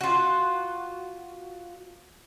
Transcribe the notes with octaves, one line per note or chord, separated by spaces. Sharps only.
F4 F#4